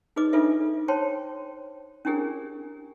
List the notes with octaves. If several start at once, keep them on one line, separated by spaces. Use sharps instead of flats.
D#4 G#4 B4 D#5 D6
D4 D#4 F4 A4 B4 E5
C5 C#5 G5 A5 C6
C#4 D4 E4 G4 G#4 A#4